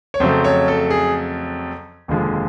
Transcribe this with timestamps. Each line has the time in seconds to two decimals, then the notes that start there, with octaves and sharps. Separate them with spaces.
0.14 C#5
0.20 F2 C#3 F#3 A3 C5
0.44 C#5
0.68 A4
0.91 G#4
2.08 F1 D#2 D3 F3 G#3